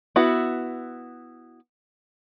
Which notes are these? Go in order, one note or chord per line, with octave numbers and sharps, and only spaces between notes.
B3 E4 F#4